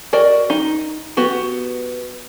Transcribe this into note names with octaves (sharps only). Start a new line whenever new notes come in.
F#4 A#4 D5 D#5
D#4
B3 F#4 G4